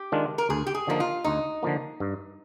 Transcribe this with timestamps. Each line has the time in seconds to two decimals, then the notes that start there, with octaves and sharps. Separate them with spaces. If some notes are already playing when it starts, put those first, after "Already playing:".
Already playing: G4
0.12 D#3 G#3 D4 F4
0.38 A#4
0.49 D2 G#4
0.67 G4
0.74 G#4
0.87 D3 F3 A#3 D#4
1.00 F4
1.24 D2 D#4
1.63 D3 F3 A#3
2.00 G2